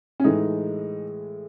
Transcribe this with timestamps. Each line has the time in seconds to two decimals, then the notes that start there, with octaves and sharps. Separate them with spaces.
0.20 C#4
0.24 A2 E3 G#3 D#4